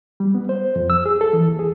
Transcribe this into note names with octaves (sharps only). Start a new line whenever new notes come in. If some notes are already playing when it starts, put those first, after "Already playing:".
G3
B3
C5
F2
E6
G#4
A4
E3
D#2
G#4